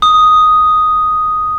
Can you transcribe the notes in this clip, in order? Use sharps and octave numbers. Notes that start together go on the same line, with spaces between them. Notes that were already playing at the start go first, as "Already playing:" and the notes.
D#6